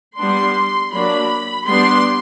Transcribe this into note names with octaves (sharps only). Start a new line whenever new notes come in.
G3 B3 D4 C6
F#3 A#3 D4 B5
G3 B3 D4 C6